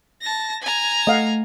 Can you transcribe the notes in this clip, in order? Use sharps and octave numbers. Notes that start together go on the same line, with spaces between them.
A5 A#6
G#5 A#5
A3 D#5 F5 F#5